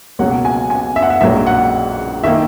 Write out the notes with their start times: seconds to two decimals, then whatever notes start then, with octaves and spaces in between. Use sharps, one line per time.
0.19 C#2 B2 F#3 A#3 F#5
0.45 G#5
0.70 G#5
0.96 E5
1.02 F#5
1.10 E5
1.21 A#1 G#2 F#3 A#3 E5
1.46 F#5
2.24 D#3 A#3 E5